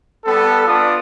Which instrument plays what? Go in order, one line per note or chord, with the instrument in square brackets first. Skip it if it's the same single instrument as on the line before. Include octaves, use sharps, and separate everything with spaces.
[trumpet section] G3 B3 A4
B3 D4 F4 D5 D#6